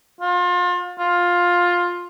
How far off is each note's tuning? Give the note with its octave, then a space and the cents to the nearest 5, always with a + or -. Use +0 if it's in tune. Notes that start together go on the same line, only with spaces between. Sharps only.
F4 +35
F4 +10